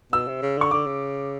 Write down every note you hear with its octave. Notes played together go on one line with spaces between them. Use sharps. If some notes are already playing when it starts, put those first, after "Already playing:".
B2 E6
C3
C#3
D3 C#6
D3 D6
C#3